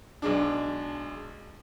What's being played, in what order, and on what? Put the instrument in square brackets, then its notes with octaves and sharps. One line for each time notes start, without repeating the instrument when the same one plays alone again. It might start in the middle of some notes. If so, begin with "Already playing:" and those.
[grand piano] B1 G#3 D4